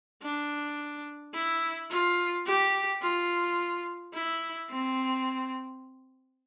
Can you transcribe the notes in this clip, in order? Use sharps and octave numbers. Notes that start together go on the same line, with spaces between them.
D4
E4
F4
G4
F4
E4
C4